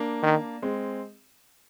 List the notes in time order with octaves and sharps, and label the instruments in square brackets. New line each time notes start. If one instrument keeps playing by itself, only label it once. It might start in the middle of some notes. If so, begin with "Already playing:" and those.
Already playing: [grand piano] A#3 D4
[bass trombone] D#3
[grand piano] G#3 C4